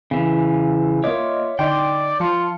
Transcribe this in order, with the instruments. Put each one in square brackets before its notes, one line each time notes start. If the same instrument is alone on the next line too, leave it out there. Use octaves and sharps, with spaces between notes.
[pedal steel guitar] C#3 E3
[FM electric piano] A#3 D#5 [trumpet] F4 [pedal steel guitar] C#5 E5 D6
[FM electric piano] D3 D#4 [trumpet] D5 [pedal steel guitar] G5 C6
[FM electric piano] F3 A5 C#7 [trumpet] F4